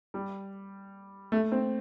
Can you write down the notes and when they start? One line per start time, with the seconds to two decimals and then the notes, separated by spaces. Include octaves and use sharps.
0.14 G3
1.32 A3
1.52 C4